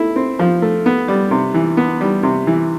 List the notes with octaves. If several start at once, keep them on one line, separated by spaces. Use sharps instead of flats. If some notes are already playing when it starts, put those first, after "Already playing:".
Already playing: A3 E4
C4
F3
A3
B3
G3
C3
E3
B3
G3
C3
E3